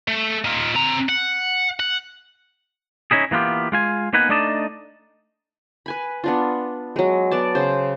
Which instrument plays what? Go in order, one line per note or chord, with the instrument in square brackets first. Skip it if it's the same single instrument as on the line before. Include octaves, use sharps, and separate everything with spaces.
[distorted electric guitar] A3
D#4 F4
C4 A#5
F#5
F#5
[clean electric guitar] C#4 D#4 E4 G#4
E3 A#3 B3 F4 G4
G#3 F4 G#5
A#3 B3 D#4 B4 F#5 G#5
A3 D4 D#4 D5 D#5 A5
[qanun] B4 G#5 B5
B3 D4 F4
F#3 G#3
B3 D5 A5
C#3 C5